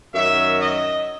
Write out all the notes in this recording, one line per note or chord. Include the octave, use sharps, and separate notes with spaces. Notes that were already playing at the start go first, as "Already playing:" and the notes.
F#2 D#3 F#3 E5
D#5